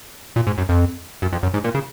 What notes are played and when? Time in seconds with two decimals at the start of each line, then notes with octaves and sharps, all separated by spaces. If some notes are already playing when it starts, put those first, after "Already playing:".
0.36 A#2
0.47 G#2
0.58 F#2
0.69 F2
1.22 F#2
1.32 F2
1.43 F#2
1.54 G#2
1.64 A#2
1.74 C#3